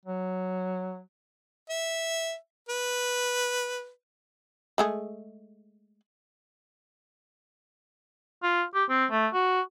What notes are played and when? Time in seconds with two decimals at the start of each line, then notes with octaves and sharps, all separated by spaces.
0.05 F#3
1.70 E5
2.69 B4
4.78 G#3 A3 G#4
8.43 F4
8.75 G4
8.90 C4
9.11 A3
9.33 F#4